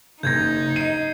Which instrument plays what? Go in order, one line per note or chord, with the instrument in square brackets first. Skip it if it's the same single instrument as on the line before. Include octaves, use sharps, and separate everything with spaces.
[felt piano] F#1 A#6 [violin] D#4 [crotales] G6 G#6
[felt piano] D#5 D#7 [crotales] C7